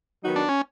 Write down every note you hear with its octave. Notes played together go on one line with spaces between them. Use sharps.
D#3 F#3 B3 D#4 F#4
D4
C#4